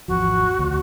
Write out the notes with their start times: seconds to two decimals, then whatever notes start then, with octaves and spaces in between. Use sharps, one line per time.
0.08 G#1 E2 F3 F#4
0.59 D2